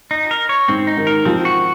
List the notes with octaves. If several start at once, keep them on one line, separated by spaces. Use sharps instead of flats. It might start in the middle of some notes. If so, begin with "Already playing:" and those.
D#4
A#4
C#5
G#2 C4
D#4
D#3
A#4
F3 C4
F#4